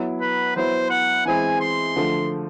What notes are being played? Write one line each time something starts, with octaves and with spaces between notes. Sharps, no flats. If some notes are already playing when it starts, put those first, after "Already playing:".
Already playing: F#3 B3 E4
B4
F#3 B3 E4 C5
F#5
E3 G#3 C4 E4 G#4 G#5
C6
D3 F3 A3